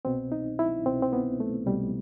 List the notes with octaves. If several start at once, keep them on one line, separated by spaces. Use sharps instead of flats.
C2 B2 C4
D#4
E4
C2 B2 C4
C4
B3
A3
C2 B2 G3